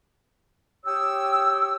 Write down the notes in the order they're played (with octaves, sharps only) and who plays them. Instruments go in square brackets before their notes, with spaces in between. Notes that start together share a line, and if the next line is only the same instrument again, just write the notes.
[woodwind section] G4 C#5 G5 D#6 E6